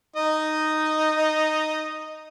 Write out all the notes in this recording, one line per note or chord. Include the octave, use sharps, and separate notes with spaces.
D#4 D#5